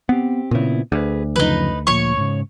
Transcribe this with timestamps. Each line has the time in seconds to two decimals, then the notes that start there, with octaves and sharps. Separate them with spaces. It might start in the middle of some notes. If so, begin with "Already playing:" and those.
0.09 B3 C4 G4
0.51 A#2 C#3 B3 C4 E4
0.92 D2 G#4 A4 B4
1.36 F#2 C#3 F3 D#4 B4
1.87 A#2 F3 C#5 C#6
2.17 G#2 C#3